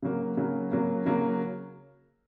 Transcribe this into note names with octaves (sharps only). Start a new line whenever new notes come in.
C#3 F#3 A#3
C#3 F#3 A#3
C#3 F#3 A#3
C#3 F#3 A#3